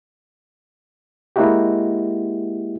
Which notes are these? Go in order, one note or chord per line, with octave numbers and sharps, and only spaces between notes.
G#3 A#3 D#4 E4 F#4 G4